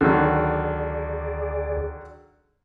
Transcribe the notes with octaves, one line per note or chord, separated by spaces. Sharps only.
D2 D3 D#3 F#3 G#4 D5